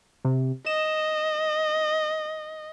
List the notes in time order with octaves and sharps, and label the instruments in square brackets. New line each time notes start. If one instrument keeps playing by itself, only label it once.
[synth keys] C3
[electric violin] D#5 [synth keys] E7